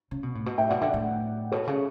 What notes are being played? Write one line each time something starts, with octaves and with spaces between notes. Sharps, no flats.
C#3
B2
A2
B2
A2 E5 G5
B2 D5 F#5
D3 E5 G5
A2
B2 A4 C#5
C#3